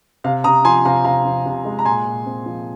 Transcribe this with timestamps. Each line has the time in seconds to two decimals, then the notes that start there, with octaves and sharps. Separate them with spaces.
0.24 C3 F5
0.44 C3 A#5 D#6
0.65 F3 G#5 C6
0.85 C3 F5 A#5
1.05 C3 F5 A#5
1.25 F3
1.46 C3
1.65 G#3
1.79 A#5
1.85 A#2 G#5 C6
2.06 A#2
2.25 C4
2.46 F3